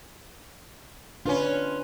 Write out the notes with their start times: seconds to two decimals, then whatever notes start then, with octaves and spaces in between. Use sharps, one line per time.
1.26 C#4 D4 F4 B4